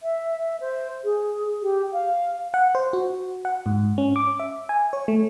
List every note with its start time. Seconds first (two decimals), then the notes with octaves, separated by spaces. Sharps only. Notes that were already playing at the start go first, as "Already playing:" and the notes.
0.02 E5
0.60 C5
1.04 G#4
1.62 G4
1.92 F5
2.54 F#5
2.75 C5
2.93 F#4
3.45 F#5
3.66 G#2
3.98 C#4
4.16 D6
4.40 E5
4.69 G#5
4.93 C#5
5.08 A3